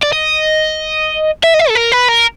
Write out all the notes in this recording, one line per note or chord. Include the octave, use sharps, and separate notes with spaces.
D5
D#5
E5
D#5
E5
A4
A#4
B4
A#4